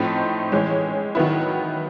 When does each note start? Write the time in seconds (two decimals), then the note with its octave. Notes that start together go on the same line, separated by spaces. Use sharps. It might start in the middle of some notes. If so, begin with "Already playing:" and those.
Already playing: A2 F3 A3 C4 D#4
0.52 E3 G#3 C#4
1.15 D#3 F#3 B3 E4